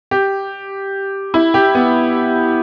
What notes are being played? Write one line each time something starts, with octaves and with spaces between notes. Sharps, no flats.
G4
E4
G4
B3